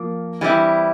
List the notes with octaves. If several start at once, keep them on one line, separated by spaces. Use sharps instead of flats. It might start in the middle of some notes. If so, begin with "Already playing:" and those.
Already playing: F3 A#3
E3 G3 C4 E4